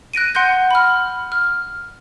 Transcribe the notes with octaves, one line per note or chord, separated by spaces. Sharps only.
F#6 A#6 D7 D#7
F#5 C6 F#6 G6 A#6
B5 F6
F6